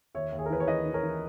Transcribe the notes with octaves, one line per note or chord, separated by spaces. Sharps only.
D#2 C#5 E5
D#2
G#4
A#4
E3 B4
C#5
E3 B4 D#5
E3
A#4 C#5
E3